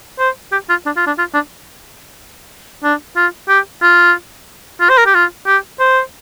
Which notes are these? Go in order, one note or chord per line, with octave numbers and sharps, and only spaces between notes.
C5
G4
F4
D4
F4
D4
F4
D4
D4
F4
G4
F4
F4
C5
A#4
G4
F4
G4
C5